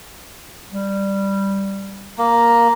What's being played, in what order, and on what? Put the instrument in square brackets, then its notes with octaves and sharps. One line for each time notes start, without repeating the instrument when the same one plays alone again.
[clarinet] G3
[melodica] A#3 [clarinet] A#5